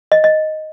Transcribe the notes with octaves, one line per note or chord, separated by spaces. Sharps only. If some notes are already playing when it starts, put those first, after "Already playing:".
D#5
D#5